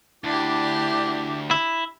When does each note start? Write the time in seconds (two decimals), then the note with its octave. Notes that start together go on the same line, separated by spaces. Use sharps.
0.24 D2 D4 E4 G4 D6
1.51 E4